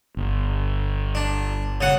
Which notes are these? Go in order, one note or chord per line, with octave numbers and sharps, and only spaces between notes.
G1
D4
C#3 F#5